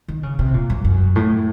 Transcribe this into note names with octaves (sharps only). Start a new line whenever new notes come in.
D#3
C#3
C3
A#2
F#2
F#2
A2